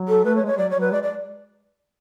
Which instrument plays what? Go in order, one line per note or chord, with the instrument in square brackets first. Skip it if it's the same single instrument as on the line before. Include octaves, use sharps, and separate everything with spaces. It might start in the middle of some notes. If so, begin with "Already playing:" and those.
Already playing: [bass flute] F#3
[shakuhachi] A4
[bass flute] A3 [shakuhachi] B4
[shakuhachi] C#5
[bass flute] G#3
[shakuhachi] C#5
[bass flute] G#3
[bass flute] F#3 [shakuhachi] D5
[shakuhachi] C#5
[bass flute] F#3 [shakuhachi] B4
[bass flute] G#3 [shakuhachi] D5
[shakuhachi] D5